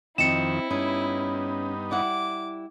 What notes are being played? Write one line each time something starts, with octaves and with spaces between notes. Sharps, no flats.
F2 D#3 C4 E4 D#5 C#7 E7
G2 B3 C#4 D#4
G3 E4 F#5 D6